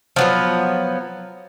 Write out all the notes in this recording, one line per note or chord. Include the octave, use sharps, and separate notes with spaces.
F3 F#3 B3